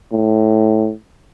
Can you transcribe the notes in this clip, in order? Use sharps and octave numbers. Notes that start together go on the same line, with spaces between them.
A2